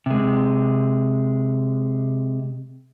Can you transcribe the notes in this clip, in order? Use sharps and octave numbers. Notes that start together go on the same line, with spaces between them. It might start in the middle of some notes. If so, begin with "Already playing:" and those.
C3 G#3